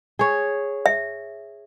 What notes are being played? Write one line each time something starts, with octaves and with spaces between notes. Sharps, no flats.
G#4 C#5
E5